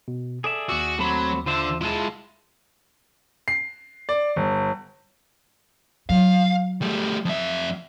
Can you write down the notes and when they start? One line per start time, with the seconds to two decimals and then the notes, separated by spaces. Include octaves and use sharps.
0.08 B2
0.44 G#4 A4 D5 E5
0.69 D#2 F#4 D6 E6
0.99 F#3 A3 C4 B5
1.46 D3 F4 C5 E5
1.81 G#3 E4 F4 A5
3.48 C7
4.09 D5
4.36 G1
6.09 F#3 F5
6.82 G3 A3
7.25 F2 E5